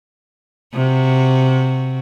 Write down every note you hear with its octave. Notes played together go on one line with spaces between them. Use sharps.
C3 F#4